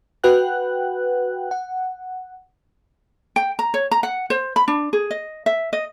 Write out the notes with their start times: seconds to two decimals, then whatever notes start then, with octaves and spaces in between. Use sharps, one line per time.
0.24 F#4 B4 F#5 G5 F#6
1.51 F#5
3.36 G5
3.59 A#5
3.74 C#5
3.91 A#5
4.03 F#5
4.30 C5
4.56 B5
4.68 D4
4.93 G#4
5.11 D#5
5.46 E5
5.73 D#5